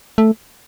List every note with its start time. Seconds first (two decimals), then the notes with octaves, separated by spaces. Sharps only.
0.18 A3